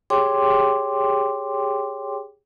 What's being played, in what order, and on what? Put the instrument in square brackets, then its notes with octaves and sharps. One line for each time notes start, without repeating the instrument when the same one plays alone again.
[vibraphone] G4 G#4 C#5 G5 C6 D6